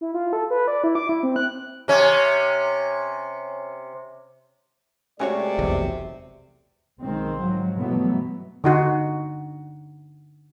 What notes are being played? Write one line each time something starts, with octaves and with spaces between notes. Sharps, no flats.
E4
F4
A4
B4
D5
E4
D6
E4
C4
F#6
C3 C#4
C3 G#3 A3 C#4 F#4 C#5 D5
F1 B1 E2
B1 D#3 G#3 C4
G#2 F3 F#3
G2 B2 E3 F#3 A3 B3
D3 D#4 F#4